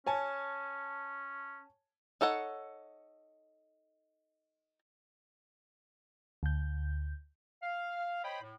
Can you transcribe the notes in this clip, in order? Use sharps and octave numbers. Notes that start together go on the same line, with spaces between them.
C#4 C#5 G#5 A5
D#4 A4 C#5 F#5
D2 G6
F5
C5 C#5 D#5 G5 B5
A2